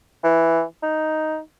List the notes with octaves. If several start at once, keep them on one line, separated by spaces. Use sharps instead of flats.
E3
D#4